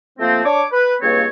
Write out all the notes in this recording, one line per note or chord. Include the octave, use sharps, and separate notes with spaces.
F3 A3 A#3 C4
D4 C#5 D6
B4
C#2 G2 A#3 C4 C#5